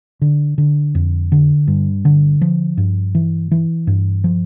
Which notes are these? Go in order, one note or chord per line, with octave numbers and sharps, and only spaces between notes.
D3
D3
F2
D3
G2
D3
F3
G2
E3
E3
G2
F3